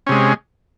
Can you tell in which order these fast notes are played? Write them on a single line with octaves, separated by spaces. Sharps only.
C#4 C3 G#3